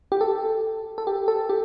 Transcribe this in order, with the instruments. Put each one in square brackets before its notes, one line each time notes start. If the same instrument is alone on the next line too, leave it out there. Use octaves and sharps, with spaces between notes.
[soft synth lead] G4
A4
A4
G4
A4
G4